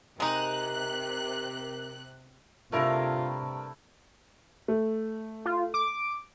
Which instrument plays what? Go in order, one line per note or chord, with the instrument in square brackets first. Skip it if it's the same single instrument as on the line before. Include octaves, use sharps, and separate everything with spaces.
[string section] C3 F#6 [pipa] G#3 D#4 [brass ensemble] G4 A#4
[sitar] G2 A#4 [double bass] C3 [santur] A3 E4 A4 [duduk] F4
[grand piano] A3
[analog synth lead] F4
D6